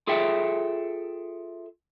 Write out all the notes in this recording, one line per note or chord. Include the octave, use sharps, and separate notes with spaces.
F4 G#4 A4 E5 G5